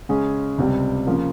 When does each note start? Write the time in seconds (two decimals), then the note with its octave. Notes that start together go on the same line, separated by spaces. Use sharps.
0.09 C#3 G#3 C#4 G#4
0.58 C#2 C3 G3
1.07 C#3 F3 A#3